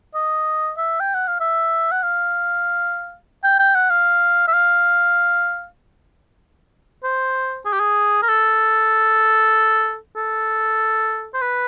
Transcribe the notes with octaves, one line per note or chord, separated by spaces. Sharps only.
D#5
E5
G5
F#5
F5
E5
F#5
F5
G5
G5
F#5
F5
E5
F5
C5
G#4
G4
G#4
A#4
A4
A4
C5
B4